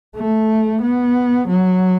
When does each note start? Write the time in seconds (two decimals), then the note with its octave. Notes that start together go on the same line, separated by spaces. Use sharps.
0.16 A3
0.82 B3
1.47 F#3